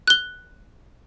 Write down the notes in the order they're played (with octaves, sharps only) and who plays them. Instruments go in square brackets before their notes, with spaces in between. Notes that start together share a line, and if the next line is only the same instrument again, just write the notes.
[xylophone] F#6 G7